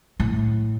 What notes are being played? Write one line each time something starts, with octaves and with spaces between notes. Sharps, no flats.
A2